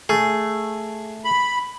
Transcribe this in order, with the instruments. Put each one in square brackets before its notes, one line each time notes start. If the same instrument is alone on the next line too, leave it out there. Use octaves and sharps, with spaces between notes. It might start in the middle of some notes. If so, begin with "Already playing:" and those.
[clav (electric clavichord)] A3 [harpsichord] G#4
[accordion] B5